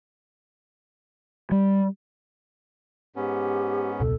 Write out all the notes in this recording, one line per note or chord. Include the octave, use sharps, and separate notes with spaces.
G3
G#2 B3 C#4 G4
E1 C#2 B2 A4